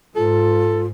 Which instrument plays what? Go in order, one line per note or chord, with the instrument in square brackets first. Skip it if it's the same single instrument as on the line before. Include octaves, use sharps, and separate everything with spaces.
[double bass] G#2 [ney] F4 [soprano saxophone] A4